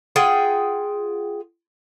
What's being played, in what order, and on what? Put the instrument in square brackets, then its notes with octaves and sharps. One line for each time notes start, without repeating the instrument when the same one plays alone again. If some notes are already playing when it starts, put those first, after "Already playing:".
[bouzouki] F4 G#4 F#5 G5